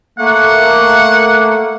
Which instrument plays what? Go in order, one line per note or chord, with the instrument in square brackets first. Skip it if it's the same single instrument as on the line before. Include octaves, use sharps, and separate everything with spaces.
[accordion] A3 A#3 [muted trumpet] F#5